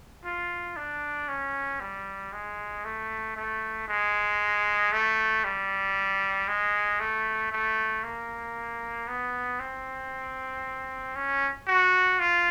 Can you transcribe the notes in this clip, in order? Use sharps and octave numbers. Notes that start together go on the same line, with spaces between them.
F4
D4
C#4
G3
G#3
A3
A3
G#3
A3
G3
G#3
A3
A3
A#3
B3
C4
C#4
F#4
F4